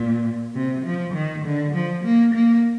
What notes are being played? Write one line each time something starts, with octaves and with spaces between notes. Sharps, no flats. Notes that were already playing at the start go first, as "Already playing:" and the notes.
Already playing: A#2
C3
F3
D#3
D3
F3
A#3
A#3